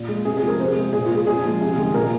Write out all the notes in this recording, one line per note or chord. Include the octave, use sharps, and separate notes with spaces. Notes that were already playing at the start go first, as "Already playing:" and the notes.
Already playing: A#2
G#3
C3 G#4
G#4
F3 G#3
A#4
C3 C5
G#3
A#2 G#4
F4
G#3 G#4
A#2 G#4
F3 G#3
C3
D#3 G#3
A#2 A#4